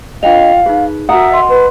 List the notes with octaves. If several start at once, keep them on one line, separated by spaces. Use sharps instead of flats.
D4 F4 B4 D#5 F5 G5 F7
D#4 G#4 B4
F#4 A#4 E5 F#5 A#5 D#6
D#5 C6
B4